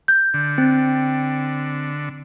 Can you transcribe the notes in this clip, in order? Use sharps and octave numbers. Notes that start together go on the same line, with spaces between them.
G6
D3
C4